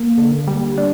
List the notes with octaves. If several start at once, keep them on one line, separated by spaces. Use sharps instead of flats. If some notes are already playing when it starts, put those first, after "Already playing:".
Already playing: A#3
D3
G3
D4